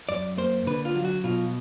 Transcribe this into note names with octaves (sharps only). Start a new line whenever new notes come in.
F#2 D5
A#3 C5
D3 B4
F4
F#3
F#4
B2 F4